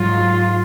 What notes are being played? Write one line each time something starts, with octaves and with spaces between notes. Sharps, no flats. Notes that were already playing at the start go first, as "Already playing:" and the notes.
Already playing: G#2 F#3 F4